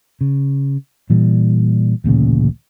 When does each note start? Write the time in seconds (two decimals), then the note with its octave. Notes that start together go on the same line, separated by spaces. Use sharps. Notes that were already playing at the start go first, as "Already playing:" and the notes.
0.21 C#3
1.10 A#2 E3 G3
2.04 D1 A1 A#2 C#3